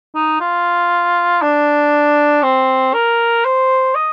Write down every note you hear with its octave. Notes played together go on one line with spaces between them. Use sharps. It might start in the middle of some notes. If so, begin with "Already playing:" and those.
D#4
F4
D4
C4
A#4
C5
D#5